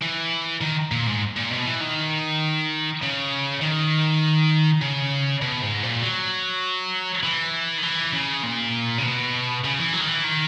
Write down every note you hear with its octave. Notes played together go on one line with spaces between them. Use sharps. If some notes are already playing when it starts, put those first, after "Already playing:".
E3
D#3
A#2
G#2
A#2
B2
E3
D#3
C#3
D#3
C#3
B2
G#2
A#2
F#3
E3
D#3
E3
C#3
A#2
C#3
B2
C#3
E3
F#3
D#3
E3
D#3